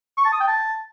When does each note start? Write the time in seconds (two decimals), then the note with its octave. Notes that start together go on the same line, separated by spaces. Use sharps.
0.18 C#6
0.25 A5
0.33 D#6
0.40 G5
0.48 A5